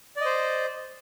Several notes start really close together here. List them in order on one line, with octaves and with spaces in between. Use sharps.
D5 D#5 C5